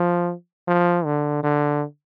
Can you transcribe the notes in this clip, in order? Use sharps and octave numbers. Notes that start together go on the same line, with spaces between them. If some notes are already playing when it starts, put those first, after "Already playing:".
Already playing: F3
F3
D3
D3